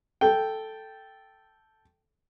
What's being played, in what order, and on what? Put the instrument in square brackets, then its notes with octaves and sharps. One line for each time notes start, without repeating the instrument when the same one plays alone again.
[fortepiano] A4 G5